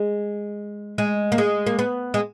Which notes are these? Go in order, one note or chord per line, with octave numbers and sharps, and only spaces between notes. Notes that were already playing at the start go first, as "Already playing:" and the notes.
Already playing: G#3
G#3
A#3
G#3
A#3
B3
G#3